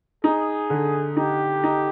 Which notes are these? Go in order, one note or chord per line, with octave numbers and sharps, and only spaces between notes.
D#4 G#4
D3
D#4 G4
D#4